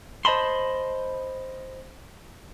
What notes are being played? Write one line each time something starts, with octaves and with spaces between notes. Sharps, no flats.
C5 D#5 A5 B5 C6